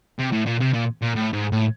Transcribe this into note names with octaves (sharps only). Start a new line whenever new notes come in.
C3
A2
A#2
C3
A#2
A#2
A2
G#2
A2